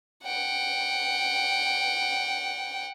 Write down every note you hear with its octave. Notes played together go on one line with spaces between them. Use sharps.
F#5 G5